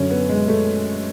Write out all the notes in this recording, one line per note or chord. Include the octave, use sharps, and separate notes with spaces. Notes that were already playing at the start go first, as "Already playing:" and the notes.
Already playing: F#2 D3 C#4
B3
G#3
A3